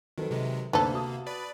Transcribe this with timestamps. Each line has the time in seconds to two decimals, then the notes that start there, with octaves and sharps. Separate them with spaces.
0.18 D#3 F#3 A4 B4
0.31 C3 D#3 G#3
0.73 D2 C3 A#3 B3 D4 A4 C5
0.94 F#4 A5 D#6
1.27 B4 D5 B5